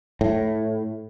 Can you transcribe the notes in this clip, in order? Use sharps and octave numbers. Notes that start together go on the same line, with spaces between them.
A2